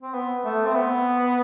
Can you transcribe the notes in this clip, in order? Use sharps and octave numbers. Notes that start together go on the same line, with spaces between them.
C4
B3
A3
C4
B3